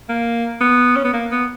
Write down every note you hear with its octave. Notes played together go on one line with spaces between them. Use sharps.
A#3
B3
C#4
B3
A#3
B3